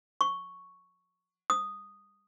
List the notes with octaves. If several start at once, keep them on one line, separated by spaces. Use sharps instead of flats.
C#6
D#6